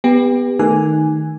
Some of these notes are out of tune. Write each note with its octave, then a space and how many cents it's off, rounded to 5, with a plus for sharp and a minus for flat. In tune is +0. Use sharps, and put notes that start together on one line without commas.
B3 +0 G4 +30
D#3 +0 A3 -5 G#5 +0